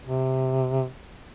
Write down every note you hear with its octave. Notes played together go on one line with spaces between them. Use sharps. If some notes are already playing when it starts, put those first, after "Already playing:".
C3